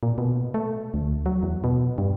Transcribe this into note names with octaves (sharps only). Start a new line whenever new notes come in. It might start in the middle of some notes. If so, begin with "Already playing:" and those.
A#2
B2
A3
D2
F#3
E2
B2
G2